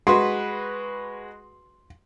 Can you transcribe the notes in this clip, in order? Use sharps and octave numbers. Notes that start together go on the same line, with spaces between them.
G#3 F#4 B4 C6